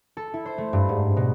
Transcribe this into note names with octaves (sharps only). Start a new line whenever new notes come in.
A4
E4
C5
A3
G2
G#2
B2